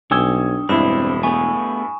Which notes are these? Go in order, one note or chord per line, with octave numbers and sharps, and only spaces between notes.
B1 D4 C#5 G5 G#5 D#6 E6 G#6
E1 G2 G#3 C4 D4 E4 B5 E7
A3 B3 G#4 G#5 C#6